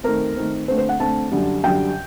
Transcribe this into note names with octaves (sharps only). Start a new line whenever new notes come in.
D#3 A3 C4 A#4
D#3 A3 C4
D3 A3 C4 C5
C5
F#5
D3 A3 C4 A5
F#2 D3 G3
F#2 D3 G3 G5